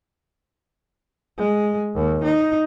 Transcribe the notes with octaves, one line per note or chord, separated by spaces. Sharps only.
G#3
D#2
D#4